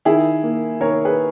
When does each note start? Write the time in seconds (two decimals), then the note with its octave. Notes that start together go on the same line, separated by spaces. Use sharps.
0.05 D#3 E4 G#4
0.43 A#3
0.80 D#3 A#4 C#5
1.05 G#4 B4